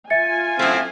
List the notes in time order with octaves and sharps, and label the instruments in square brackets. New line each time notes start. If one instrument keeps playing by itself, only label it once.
[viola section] F4 G#5 [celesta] E5 A6 C#7
[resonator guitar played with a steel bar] F#2 A3 [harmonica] C4 E4 F5